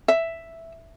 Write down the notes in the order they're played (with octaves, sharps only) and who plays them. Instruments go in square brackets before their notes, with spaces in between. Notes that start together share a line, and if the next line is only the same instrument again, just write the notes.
[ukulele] E5